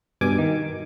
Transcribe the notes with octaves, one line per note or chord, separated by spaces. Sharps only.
G2 B2 G#5 D6
D#3